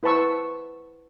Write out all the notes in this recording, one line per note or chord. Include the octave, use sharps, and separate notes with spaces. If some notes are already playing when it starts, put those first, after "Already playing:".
E4 B4 C5 A5 C#6 E6